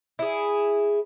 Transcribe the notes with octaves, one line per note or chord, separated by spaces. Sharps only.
E4 G#4